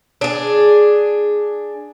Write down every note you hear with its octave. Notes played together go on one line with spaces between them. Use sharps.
D4 G#4